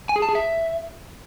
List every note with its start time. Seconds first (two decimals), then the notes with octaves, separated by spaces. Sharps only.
0.09 G#5
0.16 G#4
0.22 A5
0.29 G#4
0.35 E5